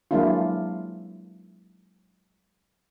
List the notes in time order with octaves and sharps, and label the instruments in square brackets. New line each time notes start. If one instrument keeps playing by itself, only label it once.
[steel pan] F#3 G#3 A#3 D4 E4 F4